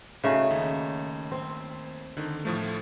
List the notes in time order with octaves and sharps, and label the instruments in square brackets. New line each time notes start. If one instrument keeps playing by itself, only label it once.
[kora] C#3 A3 D#4 [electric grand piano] F#4 G#5
[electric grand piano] D#2
[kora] C4
[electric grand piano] D3 D#3
A2 F3 A3